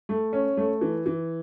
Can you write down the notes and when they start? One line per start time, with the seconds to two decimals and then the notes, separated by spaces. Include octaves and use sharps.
0.09 A3
0.33 C#4
0.57 A3
0.81 E3
1.06 E3